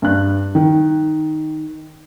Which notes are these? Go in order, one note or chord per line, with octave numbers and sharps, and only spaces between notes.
G2 F#6
D#3